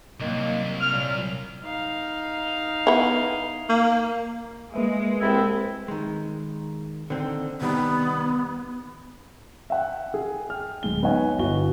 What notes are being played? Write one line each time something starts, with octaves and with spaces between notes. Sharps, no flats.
C2 D#3 F#3 A#3
F6
A#2 F#3
D#4 F5
B3 E4
A#3
G#3 A#3 B4 E5
C2 C4 E4
D#3 G#3
D3 D#3 C4
C3 D#3 G3 B3
E5 F#5 G5
G#4
G5 F6
D1 G#3 G7
B3 D#4 C#5 D#5 F#5 G#5
G1 E4 F#4 G7